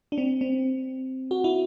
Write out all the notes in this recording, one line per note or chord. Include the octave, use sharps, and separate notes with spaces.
D4
C4
C4
F#4
E4